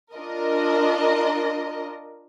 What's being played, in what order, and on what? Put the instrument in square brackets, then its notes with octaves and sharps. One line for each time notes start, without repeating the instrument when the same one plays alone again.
[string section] D4 F4 A#4 D#5